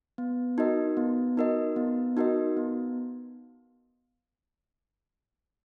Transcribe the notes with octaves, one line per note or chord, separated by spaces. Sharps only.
B3
D#4 F#4 A#4 D#5
B3
D#4 F#4 A#4 D#5
B3
D#4 F#4 A#4 D#5
B3